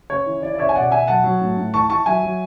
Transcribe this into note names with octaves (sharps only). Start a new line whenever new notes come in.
C#3 C#5
E3
E3 D5
D5
C#3 C#5 E5
G#5
B2 D5 F#5
B2 E5 G#5
F#3 F#5 A5
F#3
A2
A2
E3 A5 C#6
E3 A5 C#6
F#3 E5 G#5
F#3